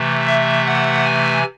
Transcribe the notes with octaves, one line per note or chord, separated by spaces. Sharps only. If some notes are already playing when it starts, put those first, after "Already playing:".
Already playing: C3 E3 A3
E5
F#5
G#5